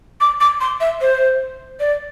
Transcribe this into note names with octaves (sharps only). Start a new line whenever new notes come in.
D6
D6
C6
E5
C5
D5